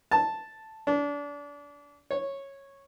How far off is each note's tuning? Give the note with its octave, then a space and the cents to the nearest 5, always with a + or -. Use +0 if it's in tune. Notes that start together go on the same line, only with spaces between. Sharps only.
A5 +0
D4 -30
C#5 -10